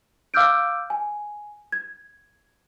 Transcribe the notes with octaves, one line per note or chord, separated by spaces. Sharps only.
F5 D6 E6 F6 G6 D7
G#5
G#6